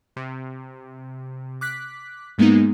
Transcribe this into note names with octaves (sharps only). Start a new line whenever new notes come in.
C3
D6 F#6 B6
G#2 G#3 A#3 B3 D#4